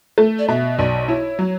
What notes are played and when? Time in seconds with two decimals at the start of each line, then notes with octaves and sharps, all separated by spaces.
0.18 A3
0.39 D5
0.48 B2 E5
0.78 B1 D5
1.08 E4 C#5
1.39 F#3